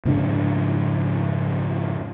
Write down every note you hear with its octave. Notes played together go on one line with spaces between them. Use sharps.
F2 G#2 C#3 D4